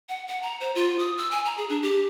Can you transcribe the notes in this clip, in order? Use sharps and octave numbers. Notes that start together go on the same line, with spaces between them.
F#5
F#5
A#5
C5
F4
D#6
E6
G#5
A#5
G#4
D4
G4